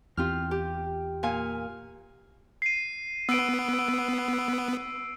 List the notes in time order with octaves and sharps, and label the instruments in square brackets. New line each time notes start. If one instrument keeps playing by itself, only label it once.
[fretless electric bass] E2 C4 [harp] F4 G4 F6
[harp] G4
A#2 F5 G#5
[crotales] C7 D#7
[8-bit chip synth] B3 [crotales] E6 D7